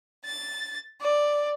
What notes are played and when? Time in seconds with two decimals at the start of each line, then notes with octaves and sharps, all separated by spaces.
0.24 A6
1.00 D5